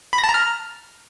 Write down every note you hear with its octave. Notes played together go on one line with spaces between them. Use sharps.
B5
A#6
A5
A#5
F6